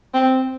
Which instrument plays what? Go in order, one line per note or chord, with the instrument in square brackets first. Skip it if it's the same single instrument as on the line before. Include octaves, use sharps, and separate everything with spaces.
[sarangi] C4